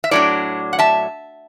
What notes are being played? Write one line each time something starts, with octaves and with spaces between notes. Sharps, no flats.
E5
A2 F#3 D4 A4 D5
F#5
E5 A5